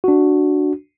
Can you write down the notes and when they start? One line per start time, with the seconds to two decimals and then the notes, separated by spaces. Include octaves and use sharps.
0.04 D4 F#4